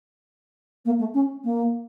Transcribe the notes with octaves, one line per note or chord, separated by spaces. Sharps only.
A#3
A3
C#4
A#3